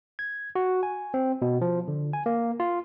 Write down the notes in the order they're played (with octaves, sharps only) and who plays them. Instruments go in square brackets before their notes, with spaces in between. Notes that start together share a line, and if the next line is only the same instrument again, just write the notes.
[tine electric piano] G#6
F#4
G#5
C4
B2
F3
D3
G#5
A#3
F4